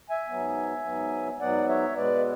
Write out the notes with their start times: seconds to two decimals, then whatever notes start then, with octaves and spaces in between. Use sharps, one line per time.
0.10 E5 G#5
0.28 G#2 F#3 B3
0.84 G#2 F#3 B3
1.40 G#2 F#3 B3 D5 F#5
1.69 C#5 E5
1.96 B2 G#3 B3 B4 D5